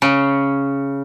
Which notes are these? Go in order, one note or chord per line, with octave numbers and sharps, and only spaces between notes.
C#3